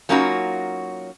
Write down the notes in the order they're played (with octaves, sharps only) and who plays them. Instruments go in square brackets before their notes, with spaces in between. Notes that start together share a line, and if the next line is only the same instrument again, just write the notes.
[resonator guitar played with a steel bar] F#3 A#3 C#4 D#4 F4 F#4